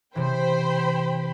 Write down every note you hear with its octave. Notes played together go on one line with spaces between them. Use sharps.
C3 E3 C5 G5 B5